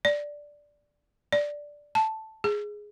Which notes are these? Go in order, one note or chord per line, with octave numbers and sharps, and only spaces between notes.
D5
D5
A5
G#4